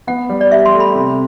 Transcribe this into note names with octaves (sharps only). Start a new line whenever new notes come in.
B3 F#5
G3
D5
G4 E5
C6
A3
B5
C3